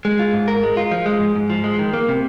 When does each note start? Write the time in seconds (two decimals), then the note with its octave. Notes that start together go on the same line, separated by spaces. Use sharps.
0.05 G#3
0.19 F4
0.33 G#2
0.48 A#4
0.63 G#3
0.77 F4
0.91 F3
1.06 G#3
1.20 G#2
1.36 G#2
1.50 F3
1.64 G#3
1.79 D#3
1.94 A#3
2.09 C3